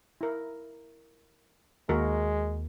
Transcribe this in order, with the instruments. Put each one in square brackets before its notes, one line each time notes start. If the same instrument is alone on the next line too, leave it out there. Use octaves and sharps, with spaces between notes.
[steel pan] E4 A#4
[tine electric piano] D#2 [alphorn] G#3 [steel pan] A#3 F#4 A#4